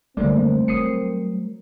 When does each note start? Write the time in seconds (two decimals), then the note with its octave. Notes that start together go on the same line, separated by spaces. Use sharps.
0.17 F#2 D3 G3 A3 A#3 C4 A#4 D5
0.68 F#3 D#6 C7 C#7